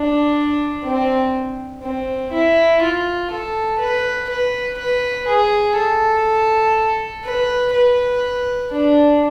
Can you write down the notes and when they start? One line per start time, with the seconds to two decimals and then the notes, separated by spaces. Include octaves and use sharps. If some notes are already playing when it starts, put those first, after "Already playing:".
Already playing: D4
0.84 C4
1.83 C4
2.32 E4
2.82 F4
3.31 A4
3.79 B4
4.29 B4
4.79 B4
5.27 G#4
5.76 A4
7.25 B4
7.73 B4
8.72 D4